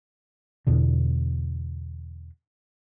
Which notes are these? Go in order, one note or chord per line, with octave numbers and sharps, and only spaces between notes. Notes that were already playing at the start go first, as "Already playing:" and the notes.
E2 B2 D3